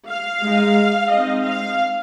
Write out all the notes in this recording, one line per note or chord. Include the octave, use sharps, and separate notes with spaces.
F5
G#3 D#4
G#3 C4 D#4 D#5
F5